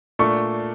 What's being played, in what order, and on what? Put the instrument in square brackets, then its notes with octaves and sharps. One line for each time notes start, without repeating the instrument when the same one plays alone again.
[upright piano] A#2 A3 D4 C#6